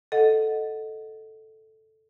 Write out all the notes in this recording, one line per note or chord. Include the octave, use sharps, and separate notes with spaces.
A4 D#5 F#5